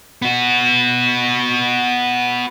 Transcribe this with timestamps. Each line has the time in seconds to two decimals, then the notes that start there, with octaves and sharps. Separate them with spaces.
0.22 B3 F#4